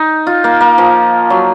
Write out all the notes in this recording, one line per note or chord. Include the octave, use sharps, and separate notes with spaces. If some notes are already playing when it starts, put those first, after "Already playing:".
Already playing: D#4
F4
A#3
A#3
F3
F#3